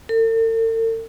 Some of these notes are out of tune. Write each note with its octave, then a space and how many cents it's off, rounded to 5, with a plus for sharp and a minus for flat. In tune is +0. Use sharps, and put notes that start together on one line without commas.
A4 +45